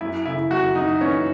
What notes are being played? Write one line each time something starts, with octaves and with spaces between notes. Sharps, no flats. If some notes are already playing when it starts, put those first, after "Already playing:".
F#2 E4
C#3 E4
F#2 F#4
F#2 D#4
E3 C#4